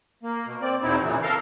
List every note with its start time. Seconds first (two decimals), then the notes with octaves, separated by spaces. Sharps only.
0.23 A#3
0.46 B2
0.62 C4 D5
0.82 E2 B2 C4 D#4 E4
1.02 F#2 A#2 C#3 E3
1.22 A4 A#4 F5